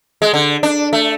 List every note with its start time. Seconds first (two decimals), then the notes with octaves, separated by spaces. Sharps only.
0.22 G#3
0.34 D3
0.63 D4
0.93 A3